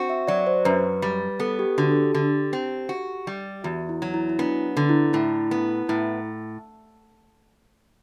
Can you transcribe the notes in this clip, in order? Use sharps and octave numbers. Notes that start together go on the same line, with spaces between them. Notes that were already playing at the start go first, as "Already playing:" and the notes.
Already playing: C4 F#4
E5
F#3 D5
C5
F#2 B4
G3
B3 A4
G4
D3 F#4
A4
G4
D3
C4
F#4
G3
E2 F#4
E4
F#3
E4
E4
B3 D4
D3
E4
A2 E4
B3
A2 E4